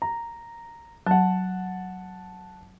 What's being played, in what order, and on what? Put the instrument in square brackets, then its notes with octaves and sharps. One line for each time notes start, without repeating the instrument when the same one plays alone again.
[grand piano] A#5
[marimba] F#3 [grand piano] F#5 A5